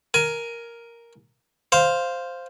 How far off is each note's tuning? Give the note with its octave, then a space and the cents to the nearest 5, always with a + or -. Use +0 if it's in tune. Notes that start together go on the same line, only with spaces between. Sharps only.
A#4 +0 G#5 +15
C5 +0 F5 +0